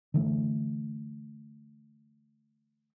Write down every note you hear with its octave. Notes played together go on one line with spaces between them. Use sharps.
D3 E3 A3